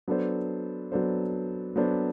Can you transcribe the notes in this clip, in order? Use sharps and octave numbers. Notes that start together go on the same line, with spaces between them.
F#3 B3 D4 A4 C5
F#3 B3 D4 A4 C5
F#3 B3 D4 A4 C5